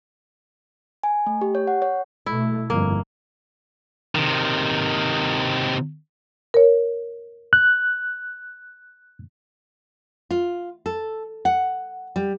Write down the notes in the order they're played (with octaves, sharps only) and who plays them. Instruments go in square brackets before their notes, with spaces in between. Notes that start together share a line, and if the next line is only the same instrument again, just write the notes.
[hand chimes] G#5
A3
G4
C#5
F#5
C#5
[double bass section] B2 A3 [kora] E4
[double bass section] G1 F2 [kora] A#3
[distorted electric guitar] C3 D#3
[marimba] A#4 C#5
[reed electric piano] F#6
[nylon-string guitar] F4
A4
F#5
G3